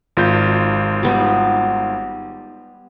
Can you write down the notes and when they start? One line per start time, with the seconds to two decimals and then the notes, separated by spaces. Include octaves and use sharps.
0.17 G#1 F4 G6
1.03 G3 B3 D#4